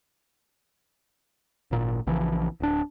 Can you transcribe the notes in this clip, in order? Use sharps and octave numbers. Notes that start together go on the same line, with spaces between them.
G#1 A#2
A#1 C#3 E3 F3
D1 D4